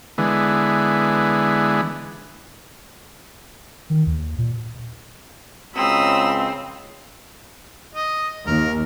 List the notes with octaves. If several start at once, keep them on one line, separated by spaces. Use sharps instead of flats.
D3 E3 G#3 B3
D#3
D#2
A#2
C#2 C4 F#4 A#5 B5 D#6 E6
D#5
D#2 A#4